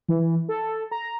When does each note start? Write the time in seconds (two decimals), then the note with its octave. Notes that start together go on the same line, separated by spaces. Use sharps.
0.09 E3
0.49 A4
0.91 A#5